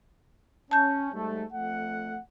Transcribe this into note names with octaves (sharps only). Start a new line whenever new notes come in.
C#4 A5 G6
G#2 G3 A3
F2 A3 F#5